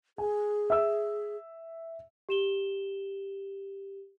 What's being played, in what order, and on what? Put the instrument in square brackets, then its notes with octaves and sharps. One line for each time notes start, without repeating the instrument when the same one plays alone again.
[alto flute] G#4 [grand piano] G#5
[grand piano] E5 E6
[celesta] G4 E7 G7